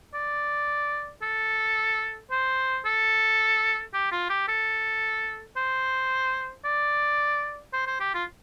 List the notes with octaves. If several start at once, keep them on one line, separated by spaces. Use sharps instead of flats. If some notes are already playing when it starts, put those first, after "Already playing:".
D5
A4
C5
A4
G4
F4
G4
A4
C5
D5
C5
C5
G4
F4